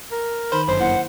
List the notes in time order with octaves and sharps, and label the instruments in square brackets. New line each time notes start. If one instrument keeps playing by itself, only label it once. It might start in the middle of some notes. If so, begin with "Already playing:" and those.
[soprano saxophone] A#4
[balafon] D#3 D#4 C6 [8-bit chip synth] C5 [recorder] B5
[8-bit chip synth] G1 F#2 [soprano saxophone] C5
[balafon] A#3 E4 [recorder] F#5